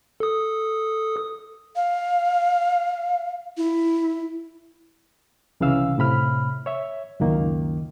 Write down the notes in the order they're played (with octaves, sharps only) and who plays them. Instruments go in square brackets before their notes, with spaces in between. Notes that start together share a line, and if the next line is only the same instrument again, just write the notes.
[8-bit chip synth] A4 D#6
[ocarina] F5
E4
[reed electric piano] C2 C#3 E3 F5 E6
A2 C3 B5 F6
C#5 E5
C#2 F#2 D#3 A#3